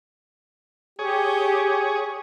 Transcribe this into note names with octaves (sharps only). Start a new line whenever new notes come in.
G4 G#4 C#5